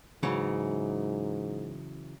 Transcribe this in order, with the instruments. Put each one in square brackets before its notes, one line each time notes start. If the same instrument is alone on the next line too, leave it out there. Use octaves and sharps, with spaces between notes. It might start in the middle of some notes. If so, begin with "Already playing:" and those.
[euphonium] G#2 [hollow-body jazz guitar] C#3 E3 F#3